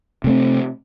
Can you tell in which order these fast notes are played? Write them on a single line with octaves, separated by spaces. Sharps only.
C3 A3 C4